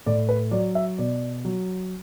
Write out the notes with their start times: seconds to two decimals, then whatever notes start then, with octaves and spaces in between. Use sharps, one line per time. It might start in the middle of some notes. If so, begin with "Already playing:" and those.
0.06 A2 D5
0.29 B4
0.51 F#3 D5
0.75 E5
0.98 B2 D5
1.45 F#3